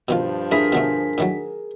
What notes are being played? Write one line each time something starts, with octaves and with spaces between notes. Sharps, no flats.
G2 B2 D#3 F3 F4
D4 E4 G#4 A#4 B6
B2 D3 A3
A2 D#3 F#3